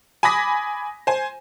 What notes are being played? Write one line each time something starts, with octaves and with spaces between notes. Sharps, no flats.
G#5 B5 D6 D#6 A#6 B6
C5 G#5